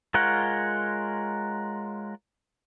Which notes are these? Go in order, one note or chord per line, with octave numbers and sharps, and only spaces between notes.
G#3 F4 A#4 C#5 F#5